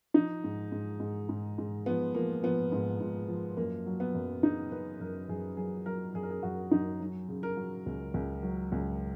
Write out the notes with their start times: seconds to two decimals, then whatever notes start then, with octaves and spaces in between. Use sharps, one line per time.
0.14 F3 D#4
0.44 G#2
0.72 G#2
1.00 G#2
1.29 G#2
1.58 G#2
1.86 F3 B3
2.15 F3 A#3
2.43 F3 B3
2.72 G#2
3.00 G#2
3.28 F3
3.57 F#2 A#3
3.86 F#3
4.00 B3
4.15 F#2
4.43 C#3 D#4
4.71 C#3 B4
5.00 F#2 A#4
5.29 F#2 G#4
5.57 F#3 G#4
5.86 F#3 A#4
6.14 F#2 G#4
6.23 A#4
6.30 G#4
6.43 F#2 F#4
6.71 F#2 D#4
7.00 F#3
7.29 C#3
7.43 A#4
7.57 F#3
7.86 C#2
8.14 C#2
8.43 F#3
8.72 C#2